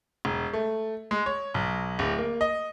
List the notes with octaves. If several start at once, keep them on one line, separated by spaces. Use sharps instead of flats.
E1
A3
G#3
C#5
B1
D1
A#3
D#5